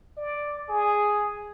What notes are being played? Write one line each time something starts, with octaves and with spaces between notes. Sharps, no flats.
D5
G#4